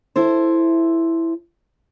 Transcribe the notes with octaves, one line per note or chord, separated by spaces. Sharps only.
E4 A4 C5